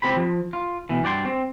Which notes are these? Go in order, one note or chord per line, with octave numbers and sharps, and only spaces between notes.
C#2 C4 G4 C5 B5
F3
F4
B2 E3
G2 F#4 D5 G5 C6
C4